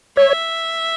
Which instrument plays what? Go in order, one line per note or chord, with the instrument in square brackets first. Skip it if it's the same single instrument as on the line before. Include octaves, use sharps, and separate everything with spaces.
[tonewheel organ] C#5 [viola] E5